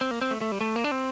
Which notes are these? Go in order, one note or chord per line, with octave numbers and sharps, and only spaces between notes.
C4
A#3
C4
A3
A3
G3
A3
A#3
D4
C4